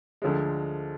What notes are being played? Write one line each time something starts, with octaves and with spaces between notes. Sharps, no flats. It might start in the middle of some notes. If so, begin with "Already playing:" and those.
D2 D3 F3 G#3